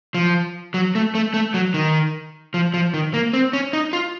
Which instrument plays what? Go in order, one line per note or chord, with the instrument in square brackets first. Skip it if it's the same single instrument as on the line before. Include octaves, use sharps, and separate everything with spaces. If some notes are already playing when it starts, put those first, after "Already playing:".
[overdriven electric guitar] F3
F#3
A3
A3
A3
F#3
D#3
F3
F3
D#3
A#3
C4
C#4
D#4
F4